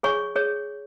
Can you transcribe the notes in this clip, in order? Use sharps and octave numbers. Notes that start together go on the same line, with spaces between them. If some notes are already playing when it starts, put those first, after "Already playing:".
G#4 C#5 G#5 C#6
G#4 C#5